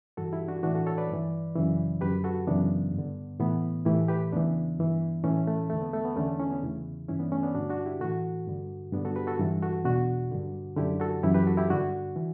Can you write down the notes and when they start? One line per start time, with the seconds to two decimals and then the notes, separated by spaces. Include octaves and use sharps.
0.17 G2 E3 F#4 A4
0.33 E4 G4
0.48 D4 F#4
0.63 A2 E3 D4 F#4
0.75 F#4 A4
0.86 A4 C#5
0.98 B4 D5
1.09 G2 E3
1.55 F#2 C#3 E3
2.01 F#2 D3 G4 B4
2.24 F#4 A4
2.47 F#2 C#3 E3 B3 D4
2.93 G2
2.98 D3
3.40 A2 E3 B3
3.85 A2 E3 E4 G4
4.08 G4 B4
4.32 E2 C#3 E3 B3 D4
4.78 G2 E3
5.24 A2 E3 A3 C#4
5.47 A3
5.70 E2 D3 A3
5.82 B3
5.93 A3
6.05 B3
6.16 E2 D3 A3 C#4
6.40 C#4 E4
6.51 B3 D4
6.62 E2 C#3 E3
7.09 G2 E3 C#4 E4
7.20 B3 D4
7.32 A3 C#4
7.43 B3 D4
7.54 G2 D3 D4 F#4
7.69 D4 F#4
7.86 E4 G4
8.00 A2 E3 F#4 A4
8.47 G2 D3
8.93 G2 D3 B3 D4
9.05 F#4 A4
9.16 G4 B4
9.27 F#4 A4
9.40 G2 E3
9.62 F#4 A4
9.85 E2 B2 D4 F#4
10.31 G2 D3
10.77 F#2 D3 E4 G4
11.00 F#4 A4
11.23 F#2 E3 E4 G4
11.34 G4 B4
11.47 F#4 A4
11.57 E4 G4
11.70 G2 D3 D4 F#4
12.16 E3